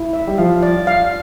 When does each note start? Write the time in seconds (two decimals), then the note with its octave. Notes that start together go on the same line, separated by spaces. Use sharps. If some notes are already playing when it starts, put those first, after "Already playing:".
Already playing: E4
0.13 E5
0.27 G3
0.38 F3 F5
0.63 D5
0.87 F5